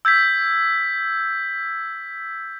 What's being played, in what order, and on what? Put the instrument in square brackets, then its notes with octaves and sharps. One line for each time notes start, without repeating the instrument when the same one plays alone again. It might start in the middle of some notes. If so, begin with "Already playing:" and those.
[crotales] E6 G6 G#6 B6